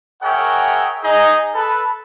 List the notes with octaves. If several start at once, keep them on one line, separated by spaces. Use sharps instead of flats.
G#4 A#4 C#5 E5 F#5 G5
D#4 G#4 D#5
A4 B4